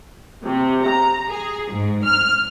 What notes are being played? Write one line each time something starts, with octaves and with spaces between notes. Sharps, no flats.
C3
A#5
G#4
G#2
F6